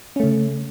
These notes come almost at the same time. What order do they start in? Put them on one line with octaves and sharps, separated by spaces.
C#4 A3 C#3